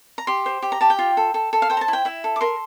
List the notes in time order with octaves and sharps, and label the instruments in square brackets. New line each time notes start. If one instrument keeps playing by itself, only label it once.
[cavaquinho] A#5
G4 C6
C5
G4
A#5
G4 A5
G5
F4
A4
A4
A4
F5
C5 G5
A#5
A5
E4
G5
E4 E5
A4
D6
A#4 C6